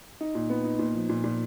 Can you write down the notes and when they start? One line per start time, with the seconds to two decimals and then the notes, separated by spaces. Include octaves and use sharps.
0.21 D#4
0.35 A#2
0.50 B3
0.64 D#4
0.79 A#2
0.94 F3
1.09 A#2
1.24 A#2